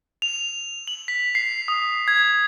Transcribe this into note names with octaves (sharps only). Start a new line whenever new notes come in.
F7
F#7
B6
C7
D#6
G#6